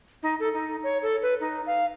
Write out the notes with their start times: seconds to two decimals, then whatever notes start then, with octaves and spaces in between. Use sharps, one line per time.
0.23 D#4
0.40 A4
0.53 D#4
0.83 C#5
1.02 A4
1.22 B4
1.40 D#4
1.66 F5